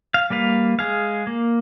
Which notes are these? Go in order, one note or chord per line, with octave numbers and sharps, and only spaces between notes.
F5
G3 A#3 B4 F5
G#3 G#4 F5
A#3